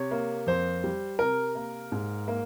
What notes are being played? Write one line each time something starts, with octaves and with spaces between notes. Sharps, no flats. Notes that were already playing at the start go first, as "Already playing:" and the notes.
Already playing: C3 C#5
A#3
F2 C5
G3
C3 A#4
A#3
G#2
A#3